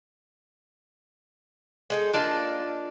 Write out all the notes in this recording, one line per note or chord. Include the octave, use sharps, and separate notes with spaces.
G#3 D#4 A4
A#3 D4 F4 D5 D#5 A5